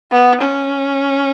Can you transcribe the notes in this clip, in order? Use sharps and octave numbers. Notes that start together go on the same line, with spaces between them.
B3
C#4